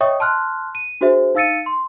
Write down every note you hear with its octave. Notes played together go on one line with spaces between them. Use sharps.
C#5 D#5 E5 G5 C#6 D#6
A5 C6 F6 F#6
D#7
D4 F#4 G#4 C5 E5
D#4 F5 E6 A6 C#7 D#7
C6